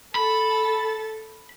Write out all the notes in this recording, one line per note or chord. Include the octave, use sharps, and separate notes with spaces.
A4 B5 A6